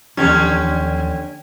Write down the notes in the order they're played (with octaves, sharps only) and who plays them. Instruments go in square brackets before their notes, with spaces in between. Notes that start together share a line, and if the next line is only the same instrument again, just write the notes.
[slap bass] D#2 E3 F3 [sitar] D3 C#4 G4